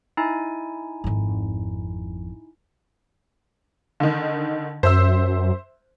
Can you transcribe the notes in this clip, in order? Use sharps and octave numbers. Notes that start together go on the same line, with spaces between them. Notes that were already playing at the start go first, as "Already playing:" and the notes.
D#4 E4 G#5
G#1 F2
D3 D#3
F#2 C5 E5 E6